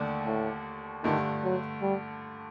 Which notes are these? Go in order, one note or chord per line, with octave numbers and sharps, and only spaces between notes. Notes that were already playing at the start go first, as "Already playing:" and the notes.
Already playing: D#2 D3 A3 D4
A2
G2 D3 D#3 A3
F#3
G3